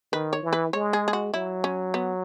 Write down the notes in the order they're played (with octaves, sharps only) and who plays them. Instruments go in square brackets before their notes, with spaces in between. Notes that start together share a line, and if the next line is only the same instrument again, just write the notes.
[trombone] D#3 [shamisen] B4
[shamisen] C#5
[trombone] E3
[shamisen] B4
[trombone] G#3 [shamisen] C#5
[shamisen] G#4
G#4
F#4
[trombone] F#3 [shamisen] E4
[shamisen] C#4
B3